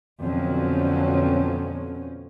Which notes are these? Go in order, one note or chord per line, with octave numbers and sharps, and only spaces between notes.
F2 B2 D3 F3 F#3 C#4